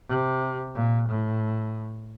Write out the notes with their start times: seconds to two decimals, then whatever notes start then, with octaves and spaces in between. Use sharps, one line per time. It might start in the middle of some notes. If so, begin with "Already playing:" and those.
0.09 C3
0.75 A#2
1.09 A2